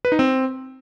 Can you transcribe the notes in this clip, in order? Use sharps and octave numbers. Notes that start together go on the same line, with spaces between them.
B4
D#4
C4